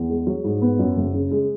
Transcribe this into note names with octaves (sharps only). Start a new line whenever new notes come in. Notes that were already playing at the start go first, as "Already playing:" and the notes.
Already playing: E2
G#3
F#3
G#2
B3
F#2
F#1
C#3
G#3